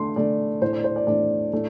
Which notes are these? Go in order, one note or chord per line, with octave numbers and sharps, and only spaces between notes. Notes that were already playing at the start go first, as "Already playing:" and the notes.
Already playing: D3 A3 D4 C6
D3 A3 D4 D5
A2 A3 D4 C5
D5
C5
D5
A2 A3 D4 D5
A2 A3 D4